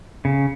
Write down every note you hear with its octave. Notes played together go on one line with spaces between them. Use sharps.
C#3